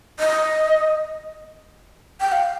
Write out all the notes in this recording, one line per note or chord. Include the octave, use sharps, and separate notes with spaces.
D#5
G5
F5